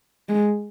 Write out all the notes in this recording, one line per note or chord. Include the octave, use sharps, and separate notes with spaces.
G#3